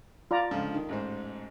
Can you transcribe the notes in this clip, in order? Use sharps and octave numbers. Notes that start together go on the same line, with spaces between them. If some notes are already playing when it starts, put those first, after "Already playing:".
F4 D5 A#5
C#2 D3 F3
D#3
A1 G#2 C5